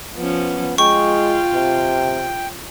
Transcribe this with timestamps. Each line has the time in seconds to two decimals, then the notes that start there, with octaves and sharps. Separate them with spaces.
0.17 F3 B3 C#4
0.78 G#3 F4 G5 C#6
1.54 C3